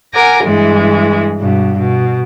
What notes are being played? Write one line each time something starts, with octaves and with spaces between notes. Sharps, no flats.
A#4 F#5 G#5 D6 A#6
G2 E3 G#3
G2 B2
B2